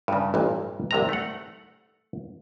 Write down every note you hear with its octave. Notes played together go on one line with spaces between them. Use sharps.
G2 C#3
A1 G2 A#2
C2 C3 A#5
A3 F#5